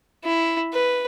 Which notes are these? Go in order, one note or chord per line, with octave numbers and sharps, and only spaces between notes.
E4
B4